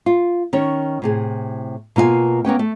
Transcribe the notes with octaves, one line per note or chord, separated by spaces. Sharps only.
F4
D#3 C#4 C#5
A2 C3 G#4
B2 A#3 F4 D5 G#5
A#3 B3 C#4 G5
A3